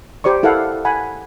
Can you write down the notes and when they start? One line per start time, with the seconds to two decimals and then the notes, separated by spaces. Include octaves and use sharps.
0.24 G4 C5 D5 C#6
0.43 E4 A4 A#4 F5 F#5
0.85 F#5 G#5 B5